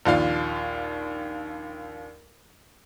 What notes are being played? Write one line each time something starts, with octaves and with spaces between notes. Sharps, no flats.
A#1 D#2 F4 F5